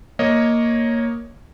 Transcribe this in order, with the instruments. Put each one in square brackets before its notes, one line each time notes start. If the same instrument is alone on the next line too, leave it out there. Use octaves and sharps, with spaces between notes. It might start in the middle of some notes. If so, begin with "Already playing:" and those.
[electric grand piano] A#3 C#5 D#5